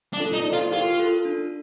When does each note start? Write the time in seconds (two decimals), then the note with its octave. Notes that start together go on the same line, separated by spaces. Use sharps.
0.13 D4
0.19 F4 A4
0.33 D#4
0.40 D5
0.46 A4 C5
0.53 F4
0.72 F4 G4 A#4
0.99 F4 A4
1.25 D4